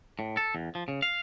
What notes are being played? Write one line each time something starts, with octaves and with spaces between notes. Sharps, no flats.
A2
A4
E2
F3
C#3
F5